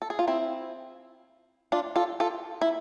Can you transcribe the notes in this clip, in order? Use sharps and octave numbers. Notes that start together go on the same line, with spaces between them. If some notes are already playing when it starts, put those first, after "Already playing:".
A4
G#4
F4
C4 E4
D4 F4
F4 A4
F4 A4
E4